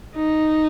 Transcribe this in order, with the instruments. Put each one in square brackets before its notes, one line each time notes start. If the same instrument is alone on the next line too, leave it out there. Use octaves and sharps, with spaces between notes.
[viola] D#4